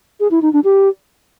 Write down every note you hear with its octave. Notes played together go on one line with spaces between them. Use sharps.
G#4
E4
D#4
D4
G4